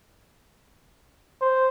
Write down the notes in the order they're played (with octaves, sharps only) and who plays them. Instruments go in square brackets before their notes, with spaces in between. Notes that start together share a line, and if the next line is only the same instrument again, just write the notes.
[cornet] C5